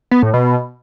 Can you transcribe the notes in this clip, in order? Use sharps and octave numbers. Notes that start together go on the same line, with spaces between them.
B3
A2
B2